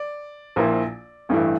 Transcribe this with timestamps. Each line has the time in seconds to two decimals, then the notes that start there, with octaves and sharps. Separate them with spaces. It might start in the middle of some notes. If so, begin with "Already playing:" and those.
Already playing: D5
0.56 A#1 A#2 F3 A#3 E4
1.29 A1 G2 E3 A3 E4